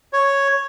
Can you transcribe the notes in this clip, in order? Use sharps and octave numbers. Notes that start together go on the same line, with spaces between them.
C#5